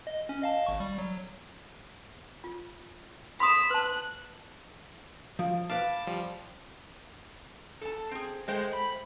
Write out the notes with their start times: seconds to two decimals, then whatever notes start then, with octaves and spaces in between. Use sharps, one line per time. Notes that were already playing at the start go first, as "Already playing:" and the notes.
0.07 D#5
0.29 C#4
0.42 D#5 F5 A5
0.67 G#1 C#6
0.80 G3
0.98 F#3
2.44 F4
3.40 B5 C6 D#6 B6 E7
3.70 B4 A5 F#6
5.39 F3
5.70 B4 F5 A5 D6
6.07 F3 G3
7.81 A4 A5
8.11 C4 G#4
8.48 G#3 A3 C5 G5
8.73 B5